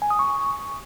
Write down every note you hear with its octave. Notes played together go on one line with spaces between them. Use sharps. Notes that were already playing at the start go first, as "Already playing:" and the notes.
G#5
D#6
C#6